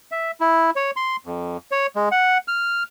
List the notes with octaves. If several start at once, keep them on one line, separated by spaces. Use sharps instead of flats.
E5
E4
C#5
C6
F2
C#5
G#3
F#5
F6